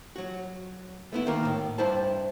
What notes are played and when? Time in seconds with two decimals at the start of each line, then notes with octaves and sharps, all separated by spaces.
0.16 F#3 F#4
1.13 A3 B3 E4
1.26 D2 D#3 A#3 A#4
1.45 A2
1.78 G2 E4 C5 A5